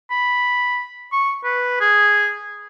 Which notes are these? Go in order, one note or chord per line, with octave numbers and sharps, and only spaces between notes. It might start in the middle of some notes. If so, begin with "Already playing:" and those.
B5
C#6
B4
G#4